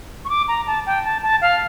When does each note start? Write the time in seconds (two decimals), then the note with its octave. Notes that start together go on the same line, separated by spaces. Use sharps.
0.25 C#6
0.29 D6
0.48 A#5
0.67 A5
0.86 G5
1.05 A5
1.23 A5
1.41 F5